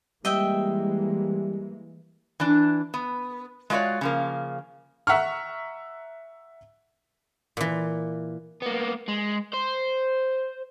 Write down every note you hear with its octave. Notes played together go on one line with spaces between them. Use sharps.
E3 G3 G#3 A#3 D#5 E5 G5
E3 D4
B3
G#3 A3 F4 F#4 C#5 D5
C#3 F3 A#3
E5 F#5 A#5 C#6 F6
A#2 E3
A#3 B3
G#3
C5